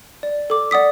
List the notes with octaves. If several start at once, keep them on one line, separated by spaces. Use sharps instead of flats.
D5
A4 D6
D5 F#5 D#6 B6